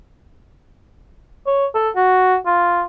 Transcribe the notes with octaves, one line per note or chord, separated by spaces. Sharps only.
C#5
A4
F#4
F4